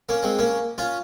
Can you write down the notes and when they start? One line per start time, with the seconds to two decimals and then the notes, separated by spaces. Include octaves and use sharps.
0.09 A#3 C#4
0.23 G#3 C4
0.39 A#3 C#4
0.78 C#4 F4